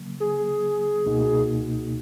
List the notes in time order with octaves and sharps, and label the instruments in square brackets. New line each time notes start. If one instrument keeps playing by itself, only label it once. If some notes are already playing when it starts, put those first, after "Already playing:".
Already playing: [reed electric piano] C#3 F#3 A#3
[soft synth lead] G#4
[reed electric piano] C#2 B2 A#3 D#4 F#4